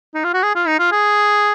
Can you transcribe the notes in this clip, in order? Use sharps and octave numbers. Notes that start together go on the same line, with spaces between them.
D#4
F4
F#4
G#4
F4
D#4
F4
G#4